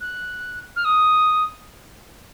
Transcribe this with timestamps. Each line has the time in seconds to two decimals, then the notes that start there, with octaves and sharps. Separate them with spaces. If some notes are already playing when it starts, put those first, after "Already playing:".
0.01 F#6
0.76 F6
0.85 D#6